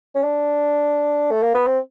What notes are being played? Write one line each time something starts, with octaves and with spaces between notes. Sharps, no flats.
C#4
D4
A3
A#3
B3
C4